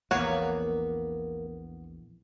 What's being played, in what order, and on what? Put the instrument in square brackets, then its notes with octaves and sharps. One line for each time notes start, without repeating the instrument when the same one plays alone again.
[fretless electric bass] A#1 E2 [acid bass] A#3 [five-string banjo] B3 C#5 F#5